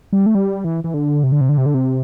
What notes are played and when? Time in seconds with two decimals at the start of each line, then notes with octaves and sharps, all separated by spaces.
0.13 G3
0.26 A3
0.35 G3
0.64 E3
0.84 E3
0.94 D3
1.23 C3
1.32 D3
1.41 C3
1.49 D3
1.58 C3
1.66 D3
1.74 C3